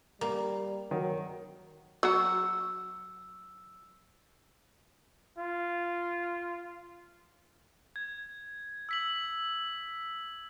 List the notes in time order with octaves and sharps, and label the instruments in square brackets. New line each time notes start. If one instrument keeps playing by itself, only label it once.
[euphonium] G3 [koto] A#3
[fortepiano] D#3 [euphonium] F#3
[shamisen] F#3 F#4 [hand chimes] E6
[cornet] F4
[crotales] G#6
E6 B6 F#7